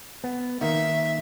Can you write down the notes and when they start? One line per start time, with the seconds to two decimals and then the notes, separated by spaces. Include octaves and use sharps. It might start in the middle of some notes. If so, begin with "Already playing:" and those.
0.24 B3
0.61 D#3 A#3 D#4 E5